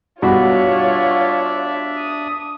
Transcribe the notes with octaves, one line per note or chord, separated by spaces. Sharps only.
G2 B2 D4 F4 F#4 C#5 D5 E5
D#6